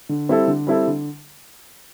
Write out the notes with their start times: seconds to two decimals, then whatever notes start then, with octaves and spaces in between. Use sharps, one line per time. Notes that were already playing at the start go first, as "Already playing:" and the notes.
0.09 D3
0.29 G3 C4 E4 A4
0.47 D3
0.67 G3 C4 E4 A4
0.87 D3